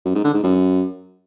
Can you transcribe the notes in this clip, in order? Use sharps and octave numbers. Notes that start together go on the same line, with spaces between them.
F#2
G#2
D3
G#2
F#2